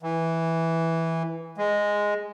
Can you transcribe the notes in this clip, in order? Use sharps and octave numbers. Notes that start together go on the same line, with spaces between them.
E3
G#3